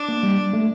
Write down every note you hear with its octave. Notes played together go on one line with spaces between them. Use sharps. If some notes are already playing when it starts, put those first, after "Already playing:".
Already playing: D4
A#3
G3
A3